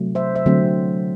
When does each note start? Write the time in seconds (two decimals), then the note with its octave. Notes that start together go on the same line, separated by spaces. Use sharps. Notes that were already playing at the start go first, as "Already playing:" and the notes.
Already playing: C3 F#3 A3
0.15 C5 E5
0.35 C5 E5
0.46 D3 F#3 A3 C4